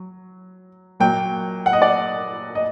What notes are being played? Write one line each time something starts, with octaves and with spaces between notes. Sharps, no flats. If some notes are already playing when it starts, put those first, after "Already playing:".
Already playing: F#3
A#2 F#3 G5
F#5
D#5
D5
D#5